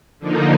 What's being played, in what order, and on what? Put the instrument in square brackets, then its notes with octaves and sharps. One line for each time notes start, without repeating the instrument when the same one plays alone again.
[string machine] D3 F3 A#3 D#4